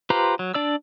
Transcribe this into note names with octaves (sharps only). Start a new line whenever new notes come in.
F4 G4 B4 C5 A#5
F#3
D4 D5 E6